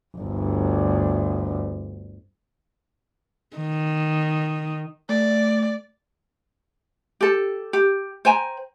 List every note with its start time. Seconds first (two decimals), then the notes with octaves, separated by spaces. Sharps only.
0.17 G1 D2
3.57 D#3
5.09 A3 D5
7.21 G4 A4
7.73 G4
8.25 C5 G5 G#5 A#5